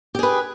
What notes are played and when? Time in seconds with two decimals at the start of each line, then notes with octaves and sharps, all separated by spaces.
0.15 G4
0.19 G#4
0.23 B4